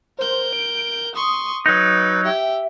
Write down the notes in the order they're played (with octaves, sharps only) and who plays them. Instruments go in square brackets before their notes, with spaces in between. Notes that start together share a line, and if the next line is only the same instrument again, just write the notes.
[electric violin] A#4 G6 [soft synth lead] C5
[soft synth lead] D7
[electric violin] C6 C#6 [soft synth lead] D#6
[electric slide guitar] F#3 D#4 [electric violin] B4
[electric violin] G4 G5 [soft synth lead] E5